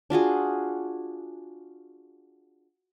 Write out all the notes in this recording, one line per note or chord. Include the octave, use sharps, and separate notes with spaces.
D4 F4 F#4 G#4